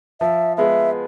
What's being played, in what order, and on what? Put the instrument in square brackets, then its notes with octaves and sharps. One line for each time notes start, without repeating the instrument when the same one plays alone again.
[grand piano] F3 [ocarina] E5
[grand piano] G#3 B3 [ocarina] E5